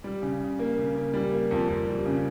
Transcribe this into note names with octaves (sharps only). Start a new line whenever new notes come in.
G3
C#3
C#3
A#3
C#3
A#3
G3
A#3
F2
F2
G3
C#3